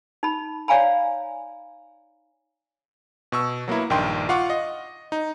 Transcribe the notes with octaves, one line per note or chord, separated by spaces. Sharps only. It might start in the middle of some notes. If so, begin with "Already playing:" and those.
D#4 B5
C#5 D5 F5 G#5 A#5 B5
B2 C#6 E6
F#3 A#3 B3 E4
A#1 G2 D#3 G5 C6
F4 F5 F#5 C#6 D6
D#5
D#4